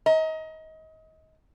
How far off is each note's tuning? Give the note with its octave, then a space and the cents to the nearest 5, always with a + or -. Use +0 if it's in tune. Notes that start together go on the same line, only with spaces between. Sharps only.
D#5 +30 A#5 +0